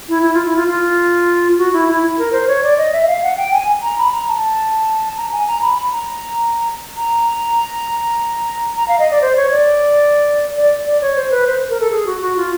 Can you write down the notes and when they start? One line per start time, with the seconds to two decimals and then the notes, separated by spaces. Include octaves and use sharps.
0.09 E4
0.23 E4
0.34 F4
0.46 E4
0.56 F4
0.68 F4
1.58 F#4
1.73 E4
1.88 E4
2.03 E4
2.19 A#4
2.32 C5
2.48 C#5
2.63 D5
2.78 D#5
2.93 E5
3.03 E5
3.07 F5
3.23 F#5
3.37 G5
3.53 G#5
3.82 A#5
3.98 B5
4.12 A#5
4.28 A5
5.17 A#5
5.32 G#5
5.48 A#5
5.62 B5
5.78 B5
5.92 A#5
6.97 A#5
8.77 A#5
8.88 F5
8.99 D#5
9.11 D5
9.22 C5
9.37 C#5
9.51 D5
10.57 D5
10.87 D5
11.02 C#5
11.16 C5
11.31 B4
11.47 C5
11.69 A#4
11.80 A4
11.91 G#4
12.06 F#4
12.21 F#4
12.36 F4